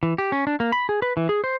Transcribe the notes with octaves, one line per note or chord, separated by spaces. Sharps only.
E3
G4
C#4
D4
A#3
B5
G#4
B4
E3
G#4
C5